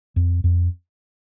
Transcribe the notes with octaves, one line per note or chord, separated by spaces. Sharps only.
F2
F2